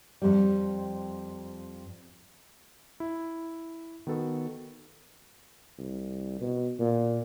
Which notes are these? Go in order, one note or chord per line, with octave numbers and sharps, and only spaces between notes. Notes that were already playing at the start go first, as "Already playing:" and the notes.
F2 G3
E4
D#3 B3 F#4 A4 B4
C2
B2
A#2